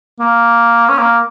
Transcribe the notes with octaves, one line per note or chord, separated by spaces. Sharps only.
A#3
C#4
A#3